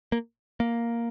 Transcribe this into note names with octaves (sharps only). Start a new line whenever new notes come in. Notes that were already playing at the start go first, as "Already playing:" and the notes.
A#3
A#3